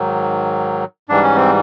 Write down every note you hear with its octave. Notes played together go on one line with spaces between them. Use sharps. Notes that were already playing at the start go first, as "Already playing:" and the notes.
Already playing: G#2 D#3 F#3
G#2 E3 G3 D4
C#4
C4